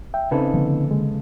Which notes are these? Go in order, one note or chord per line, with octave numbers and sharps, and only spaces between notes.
E5 G5
C#3 C4 D#4 A4 B4
D3 F3 A#3
G#3